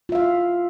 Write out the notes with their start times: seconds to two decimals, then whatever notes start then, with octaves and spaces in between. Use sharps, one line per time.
0.09 F4
0.12 E5
0.15 F5